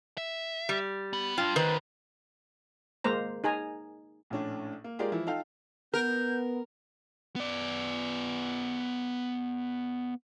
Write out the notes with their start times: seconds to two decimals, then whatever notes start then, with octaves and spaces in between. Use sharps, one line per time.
0.18 E5
0.69 G3
1.13 B3
1.38 G3 D4 F4
1.56 D#3 F#4 B4 C5
3.04 G#3 A#3 C5 A#5
3.44 D#4 G#4 G#5 A#5
4.30 A#1 A2 C#4 D4
4.84 A#3
4.99 G#3 F4 G4 G#4 A#4 D5
5.12 E3 F3 E4
5.27 D#4 F4 A4 F5 G5
5.94 B3 A#4 G6
7.36 B3 D5